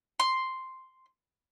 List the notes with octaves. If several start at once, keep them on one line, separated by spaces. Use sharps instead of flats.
C6